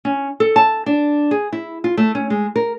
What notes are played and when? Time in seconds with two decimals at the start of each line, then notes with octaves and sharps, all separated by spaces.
0.05 C#4
0.40 A4
0.56 A5
0.86 D4
1.31 G#4
1.53 E4
1.84 F4
1.97 A3
2.15 C#4
2.30 G#3
2.56 A#4